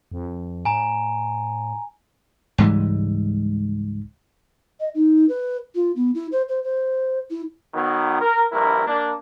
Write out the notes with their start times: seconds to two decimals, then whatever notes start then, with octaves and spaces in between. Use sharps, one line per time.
0.12 F2
0.65 A2 G#5 A#5
2.58 C#2 G#2 E3 G3
4.80 D#5
4.95 D#4
5.29 B4
5.75 F4
5.96 B3
6.15 E4
6.32 C5
6.49 C5
6.64 C5
7.30 E4
7.74 D#3 F#3 B3
8.21 A#4
8.52 A#1 G2 E4 A#4
8.87 A#3 D4